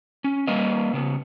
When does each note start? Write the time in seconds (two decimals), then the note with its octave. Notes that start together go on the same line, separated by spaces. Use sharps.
0.24 C#4
0.47 G3 A#3 B4 D#5 F5
0.93 C#3 B3